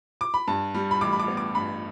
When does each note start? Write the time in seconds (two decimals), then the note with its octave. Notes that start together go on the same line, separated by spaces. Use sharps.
0.21 D6
0.34 B5
0.48 G2 A5
0.74 G3
0.91 B5
1.01 A1 D6
1.13 B5
1.19 D6
1.28 B3
1.37 D6
1.54 G2 B5